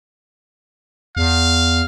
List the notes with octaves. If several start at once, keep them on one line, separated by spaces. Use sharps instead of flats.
E2 F5